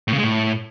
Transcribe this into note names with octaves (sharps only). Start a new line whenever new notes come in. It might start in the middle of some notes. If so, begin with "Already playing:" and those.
A2
C#3
G#3
A2